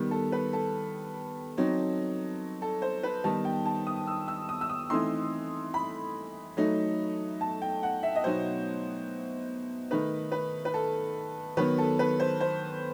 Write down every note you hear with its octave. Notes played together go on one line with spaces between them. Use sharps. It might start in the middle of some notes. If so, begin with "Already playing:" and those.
Already playing: D#3 G3 B3
A4
B4
A4
F#3 C4 D#4
A4
C5
B4
D#3 G3 B3 D#4 A5
G5
A5
D#6
E6
E6
D#6
E6
D#6
E3 A3 C4 D#4 C6
B5
F#3 A3 D#4
A5
G5
F#5
E5
D#5
B2 F#3 B3 D#4 C5
D#3 A3 D#4 B4
B4
B4
A4
D#3 F#3 B3 B4
A4
B4
C5
C5